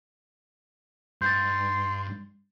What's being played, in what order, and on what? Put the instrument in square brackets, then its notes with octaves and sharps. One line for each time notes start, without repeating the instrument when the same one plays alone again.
[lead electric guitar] G2 [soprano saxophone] C6 [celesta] G6 A6